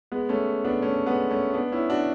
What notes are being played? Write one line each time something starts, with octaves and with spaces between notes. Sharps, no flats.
G#3 B3
A3 C#4
B3 D4
A3 C#4
G#3 B3
A3 C#4
B3 D4
C#4 E4
D4 F#4